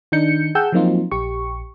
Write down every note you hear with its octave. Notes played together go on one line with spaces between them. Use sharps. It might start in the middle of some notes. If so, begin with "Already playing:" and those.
D#3 D4 D#4 G6 C#7
G#4 F#5 G5 A5 E6 G6
F3 F#3 A#3 C4 D#4 F4
A#1 G4 C#6